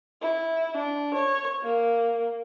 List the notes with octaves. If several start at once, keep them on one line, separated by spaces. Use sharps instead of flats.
E4
D4
C#5
A#3